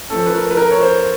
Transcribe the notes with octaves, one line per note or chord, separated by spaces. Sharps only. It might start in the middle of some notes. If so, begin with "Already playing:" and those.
F3 A3 C#4 A4
B4
A#4
B4
A#4
C#5
C5